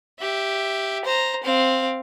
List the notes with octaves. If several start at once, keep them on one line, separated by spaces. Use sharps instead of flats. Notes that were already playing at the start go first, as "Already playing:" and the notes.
G4 E5
C5 A#5
C4 F5